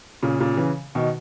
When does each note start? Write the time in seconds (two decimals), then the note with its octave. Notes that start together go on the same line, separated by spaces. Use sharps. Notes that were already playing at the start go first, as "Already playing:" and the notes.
0.23 A#2 C#3
0.40 A#2 C#3
0.57 C#3 E3
0.95 B2 D#3